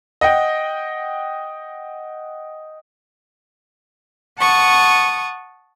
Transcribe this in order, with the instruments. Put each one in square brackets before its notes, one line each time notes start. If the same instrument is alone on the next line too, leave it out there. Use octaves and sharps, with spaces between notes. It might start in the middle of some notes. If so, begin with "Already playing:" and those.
[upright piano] D#5 F#5 G5
[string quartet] F#5 A5 C#6 D#6